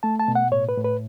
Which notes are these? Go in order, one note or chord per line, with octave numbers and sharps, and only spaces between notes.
A3 A5
A5
B2
F#5
A2 C#5
B4
A2
B4